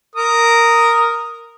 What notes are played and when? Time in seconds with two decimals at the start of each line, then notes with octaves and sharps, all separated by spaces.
0.16 A#4 D#6